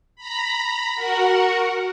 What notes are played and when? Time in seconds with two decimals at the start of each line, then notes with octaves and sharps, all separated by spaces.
0.16 A#5 B5
0.94 F#4 A#4 F#5